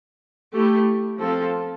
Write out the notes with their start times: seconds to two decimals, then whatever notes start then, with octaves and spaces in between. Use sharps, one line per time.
0.54 A3 E4 G4
1.20 F3 C4 F4 A4